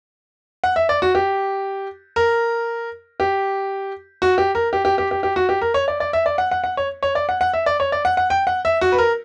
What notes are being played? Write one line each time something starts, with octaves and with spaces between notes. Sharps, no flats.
F#5
E5
D5
F#4
G4
A#4
G4
F#4
G4
A#4
G4
G4
G4
G4
G4
F#4
G4
A#4
C#5
D5
D5
E5
D5
F#5
F#5
F#5
C#5
C#5
D5
F#5
F#5
E5
D5
C#5
D5
F#5
F#5
G5
F#5
E5
F#4
B4
A#4